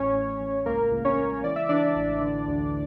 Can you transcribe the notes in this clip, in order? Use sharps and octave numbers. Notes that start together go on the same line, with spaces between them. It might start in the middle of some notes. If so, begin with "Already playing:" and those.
Already playing: A1 C#4 C#5
A1
A1
C#2 A#3 A#4
C#2
C#4 C#5
C#2
E3 D5
E5
E3 D4 D5
A1
D3
D2